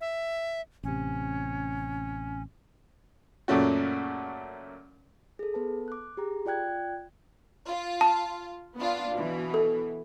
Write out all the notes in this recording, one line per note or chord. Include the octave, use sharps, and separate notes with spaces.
E5
A1 C3 C#4
F#2 A#2 C#3 A3 C#4 F#4
G#4 A4
B3 A4 B4 A5
D6 F#6
G4 G#4 A#5
F4 D5 G5 F#6 G#6
F4
A5
B3 D4 F4
B2 E3
A4